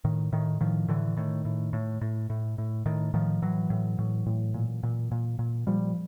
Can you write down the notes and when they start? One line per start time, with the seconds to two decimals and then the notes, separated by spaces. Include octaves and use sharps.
0.04 A2 D#3
0.32 A2 D#3
0.60 A2 D#3 F3
0.88 A2 D3 E3
1.17 A2 D#3
1.45 A2
1.73 A2
2.01 A2
2.30 A2
2.58 A2
2.86 A2 D#3
3.14 A2 D#3 F3
3.42 A2 E3 F#3
3.70 A2
3.98 A2
4.26 A2
4.54 A#2
4.83 A#2
5.11 A#2
5.39 A#2
5.67 A#2 F3 G3